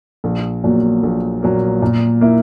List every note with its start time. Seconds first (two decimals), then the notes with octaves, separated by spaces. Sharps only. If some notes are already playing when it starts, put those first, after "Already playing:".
0.24 A#1
0.64 A#2 F#3 A#3
1.03 A#1
1.43 A#2 F#3 A#3
1.82 A#2
2.21 A#3 E4